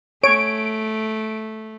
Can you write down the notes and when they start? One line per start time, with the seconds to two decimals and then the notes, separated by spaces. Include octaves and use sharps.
0.23 A3 C#5 D7